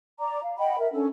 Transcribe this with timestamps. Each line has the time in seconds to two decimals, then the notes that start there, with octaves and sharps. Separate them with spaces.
0.19 D5 A#5 D6
0.42 F5
0.58 D#5 F#5 G5 B5
0.78 A#4 E5
0.92 C#4 D4 A4